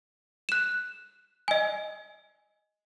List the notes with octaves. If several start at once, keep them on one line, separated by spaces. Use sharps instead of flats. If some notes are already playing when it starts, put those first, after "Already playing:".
F#6 E7
D#5 G#5